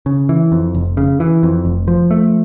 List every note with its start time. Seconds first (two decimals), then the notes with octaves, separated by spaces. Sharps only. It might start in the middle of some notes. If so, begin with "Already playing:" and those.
0.06 C#3
0.29 E3
0.52 F2
0.74 F1
0.97 C#3
1.20 E3
1.43 F2
1.65 F1
1.88 F3
2.11 A3